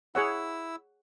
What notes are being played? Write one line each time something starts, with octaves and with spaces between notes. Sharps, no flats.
E4 G#4 C#5 F#5 E6